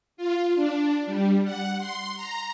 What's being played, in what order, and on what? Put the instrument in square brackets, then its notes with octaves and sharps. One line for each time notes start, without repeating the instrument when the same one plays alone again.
[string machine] F4
D4
G3
F#5
C6
A#5